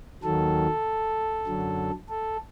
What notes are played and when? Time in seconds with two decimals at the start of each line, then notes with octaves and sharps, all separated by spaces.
0.23 D#2 D#3 F#3 A4
1.47 F#2 D3 F#3
2.09 A4